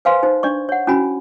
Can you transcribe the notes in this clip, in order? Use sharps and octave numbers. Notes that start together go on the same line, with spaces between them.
B4 C5 F5 G#5 C6
D#4 C5
D4 D5 C#6
C#5 F#5
C#4 E4 F#4 G#5 B5